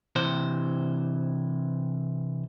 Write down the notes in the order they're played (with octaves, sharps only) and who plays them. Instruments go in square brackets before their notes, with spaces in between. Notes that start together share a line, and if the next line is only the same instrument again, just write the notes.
[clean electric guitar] C3 E3 C5